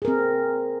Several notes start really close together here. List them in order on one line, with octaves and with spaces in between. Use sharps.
G#4 A#4 C4